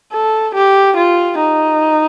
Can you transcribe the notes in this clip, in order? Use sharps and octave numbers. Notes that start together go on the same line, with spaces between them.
A4
G4
F4
D#4